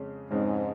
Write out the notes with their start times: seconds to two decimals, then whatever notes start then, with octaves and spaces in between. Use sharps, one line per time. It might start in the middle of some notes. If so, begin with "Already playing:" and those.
Already playing: F2 C#3 G#3 C#4
0.30 F2 G#2 C#3 G#3 C#4